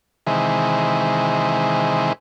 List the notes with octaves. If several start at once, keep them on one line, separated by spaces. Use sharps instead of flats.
C3 D#3 E3 G#3